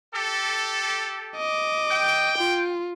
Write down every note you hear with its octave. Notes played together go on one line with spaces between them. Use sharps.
G4 A4
D#5 D6
G5
F4